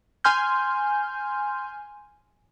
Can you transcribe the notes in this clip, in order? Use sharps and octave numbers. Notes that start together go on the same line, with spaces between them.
G#5 C6 F6 G6